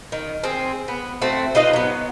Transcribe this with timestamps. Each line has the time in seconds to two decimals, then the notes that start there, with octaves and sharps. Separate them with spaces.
0.12 D#3
0.44 C4 G#4
0.88 B3
1.22 A3 C4 F#4
1.55 D#4 F4 B4 D#5
1.73 F#3 B3